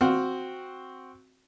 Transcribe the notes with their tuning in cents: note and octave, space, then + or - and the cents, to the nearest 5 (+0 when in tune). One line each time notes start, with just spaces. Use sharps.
C4 +0 F#4 +0 F5 +0